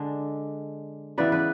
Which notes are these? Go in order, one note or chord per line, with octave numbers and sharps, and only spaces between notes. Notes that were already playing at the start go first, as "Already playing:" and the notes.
Already playing: D3 G#3 D4
C#3 E3 B3 E4 B4 D5
B4